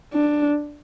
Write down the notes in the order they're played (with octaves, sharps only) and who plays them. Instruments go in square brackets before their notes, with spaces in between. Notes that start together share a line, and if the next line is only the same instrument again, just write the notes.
[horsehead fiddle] D4